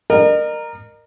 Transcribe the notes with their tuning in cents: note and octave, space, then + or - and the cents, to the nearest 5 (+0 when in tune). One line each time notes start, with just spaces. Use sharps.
A#4 +0 D#5 -40